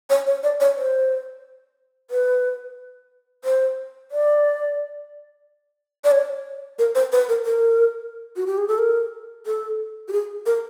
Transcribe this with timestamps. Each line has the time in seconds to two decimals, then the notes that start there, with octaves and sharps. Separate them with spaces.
0.10 C#5
0.27 C#5
0.43 D5
0.60 C#5
0.77 C5
2.10 B4
3.44 C5
4.11 D5
6.04 D5
6.11 C#5
6.79 A#4
6.95 C5
7.12 B4
7.29 A#4
7.45 A#4
8.36 F#4
8.47 G4
8.58 G#4
8.68 A4
8.78 A#4
9.46 A4
10.08 G4
10.12 G#4
10.46 A#4